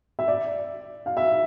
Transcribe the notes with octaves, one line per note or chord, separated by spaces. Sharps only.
E5
D5
F5
E5